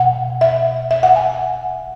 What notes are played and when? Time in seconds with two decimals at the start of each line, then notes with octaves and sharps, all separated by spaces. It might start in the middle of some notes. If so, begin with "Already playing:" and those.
Already playing: B2 F#5
0.41 E5
0.91 E5
1.03 F#5
1.16 G#5